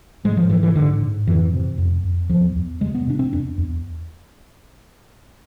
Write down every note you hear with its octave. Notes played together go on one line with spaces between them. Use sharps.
G#2 G#3
F3
G#2 E3
E3
G#2 D3
G#2
F2 E3
C3
F2
F2
E2 F3
E2
C3 G#3
B3
C3 D4
C4
E2 D4
E2